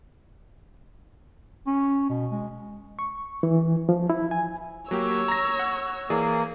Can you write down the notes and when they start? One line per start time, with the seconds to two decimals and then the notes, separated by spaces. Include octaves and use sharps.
1.67 C#4
2.10 B2
2.32 G#3
2.99 C#6
3.43 E3
3.89 F3
4.10 E4
4.31 G#5
4.91 F#3 A#3 G4 C#5 E6
5.28 A#5 A#6
5.59 F#5
6.10 E3 A#3 G#4 D5